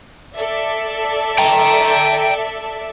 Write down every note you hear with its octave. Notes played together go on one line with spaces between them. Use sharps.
A4 D5 E5
G5 A#5